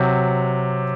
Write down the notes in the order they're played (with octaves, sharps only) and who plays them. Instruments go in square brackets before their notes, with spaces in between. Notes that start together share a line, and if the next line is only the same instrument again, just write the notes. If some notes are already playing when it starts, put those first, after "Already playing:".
Already playing: [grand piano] C3 F#3